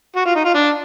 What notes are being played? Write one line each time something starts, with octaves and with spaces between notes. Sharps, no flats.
F#4
F4
D#4
F4
D4